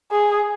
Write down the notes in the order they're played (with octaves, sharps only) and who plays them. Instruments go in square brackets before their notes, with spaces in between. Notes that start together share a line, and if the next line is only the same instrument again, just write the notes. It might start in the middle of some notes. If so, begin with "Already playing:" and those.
[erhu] G#4